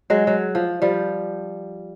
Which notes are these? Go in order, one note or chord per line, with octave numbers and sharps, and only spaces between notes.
F#3 G#3
F#3
F3
F3 G3